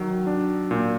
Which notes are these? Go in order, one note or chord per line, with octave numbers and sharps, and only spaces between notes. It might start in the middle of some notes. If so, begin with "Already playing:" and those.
Already playing: D#3 F#3
D4
A#2